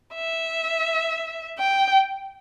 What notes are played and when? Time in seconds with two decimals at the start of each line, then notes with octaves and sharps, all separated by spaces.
0.15 E5
1.59 G5